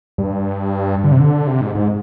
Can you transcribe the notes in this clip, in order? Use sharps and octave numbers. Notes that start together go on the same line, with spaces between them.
G2
D3
C3
D3
C3
G#2
G#2